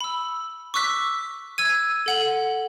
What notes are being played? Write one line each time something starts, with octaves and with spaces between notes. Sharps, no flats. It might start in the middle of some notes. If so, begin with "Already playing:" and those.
B5 E6
C#6 D6 E6 F#6 B6
E6 G#6 D#7
A4 F#5 F#7